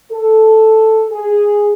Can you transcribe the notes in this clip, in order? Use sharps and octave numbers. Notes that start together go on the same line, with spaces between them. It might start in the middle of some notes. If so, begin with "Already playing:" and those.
A4
G#4